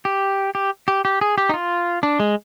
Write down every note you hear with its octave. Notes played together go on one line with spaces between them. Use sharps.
G4
G4
G4
G4
G#4
G4
D#4
F4
D4
G#3